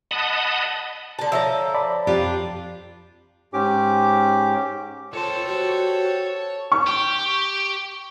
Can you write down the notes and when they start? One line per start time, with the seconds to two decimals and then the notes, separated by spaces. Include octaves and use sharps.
0.11 D#5 F#5 A5 B5 D#6
1.19 D3 A5
1.32 F3 A4 C#5 E5 A#5 E6
1.74 D5 A5 B5
2.07 F2 D4 F4 G4
3.53 G#2 C#4 G4 D6
5.13 C4 F4 A4 C#5 C6
5.46 G3 F#4 C5
6.72 C#6
6.87 G4